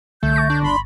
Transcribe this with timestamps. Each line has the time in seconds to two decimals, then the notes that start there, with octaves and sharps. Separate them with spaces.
0.23 C2 D3 A3 G6
0.36 C#6 A6 A#6
0.50 D4
0.62 G1 B5 C6